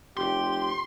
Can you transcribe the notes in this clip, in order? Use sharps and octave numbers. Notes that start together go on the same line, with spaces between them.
F1 G4 C6